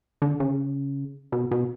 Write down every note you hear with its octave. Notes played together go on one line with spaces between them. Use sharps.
D3
C#3
B2
B2